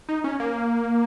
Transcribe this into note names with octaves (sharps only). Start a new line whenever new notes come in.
D#4
C#4
A#3